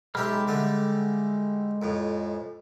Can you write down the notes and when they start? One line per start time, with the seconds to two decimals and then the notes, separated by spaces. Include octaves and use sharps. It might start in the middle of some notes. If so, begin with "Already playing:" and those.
0.15 B1 G#3 G4 E5 B5 F6
0.48 D3 G3 A3
1.82 F2 A2